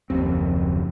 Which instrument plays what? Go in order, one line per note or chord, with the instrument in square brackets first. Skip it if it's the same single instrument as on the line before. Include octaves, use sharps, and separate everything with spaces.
[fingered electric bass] F#1 F3 C4 [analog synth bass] D#2